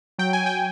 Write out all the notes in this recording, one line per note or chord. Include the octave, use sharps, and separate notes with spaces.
F#3 G5
G#5
G5